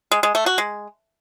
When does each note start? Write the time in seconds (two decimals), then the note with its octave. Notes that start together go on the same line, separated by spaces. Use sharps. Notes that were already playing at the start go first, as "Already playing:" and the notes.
0.11 G#3
0.23 G#3
0.35 A3
0.46 F#4
0.58 G#3